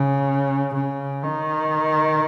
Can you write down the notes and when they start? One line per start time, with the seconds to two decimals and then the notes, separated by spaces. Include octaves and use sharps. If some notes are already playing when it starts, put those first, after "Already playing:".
Already playing: C#3
0.74 C#3
1.24 D#3